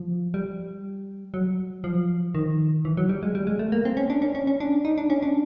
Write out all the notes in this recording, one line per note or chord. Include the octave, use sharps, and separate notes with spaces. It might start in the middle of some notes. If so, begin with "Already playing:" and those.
Already playing: F3
G3
F#3
F3
D#3
E3
F#3
G3
G#3
G3
G#3
A3
A#3
C4
C#4
D4
C#4
C#4
C#4
D4
D#4
D4
C#4
D4